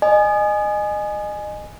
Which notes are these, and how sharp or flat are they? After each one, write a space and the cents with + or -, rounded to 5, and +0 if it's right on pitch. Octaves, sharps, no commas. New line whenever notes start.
D#5 -30 G#5 +0